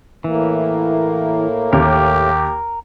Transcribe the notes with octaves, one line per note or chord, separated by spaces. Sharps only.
A2 E3 A#3
D#2 G4 A#4